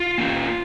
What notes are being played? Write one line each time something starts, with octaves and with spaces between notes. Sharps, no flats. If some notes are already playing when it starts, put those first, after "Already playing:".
Already playing: F4
A#3 C#4